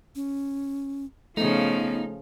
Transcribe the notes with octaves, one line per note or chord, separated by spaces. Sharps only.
C#4
C#3 F3 A3 B3 D#4